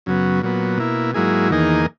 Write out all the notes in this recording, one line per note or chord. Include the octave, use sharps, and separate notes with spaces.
F#2 C#3 F#3 B3
A#2 F#3 B3
B2 A#3 E4
G#2 F#3 A#3 E4 G#4
E2 D#3 A#3 D#4 G#4